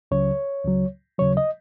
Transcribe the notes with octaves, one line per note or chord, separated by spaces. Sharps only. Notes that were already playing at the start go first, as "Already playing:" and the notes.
C#2 C#3 F#3 C#5
C#2 C#3 F#3
D#2 C#3 F#3 C#5
D#5